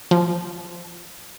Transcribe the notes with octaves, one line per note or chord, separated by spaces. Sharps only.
F3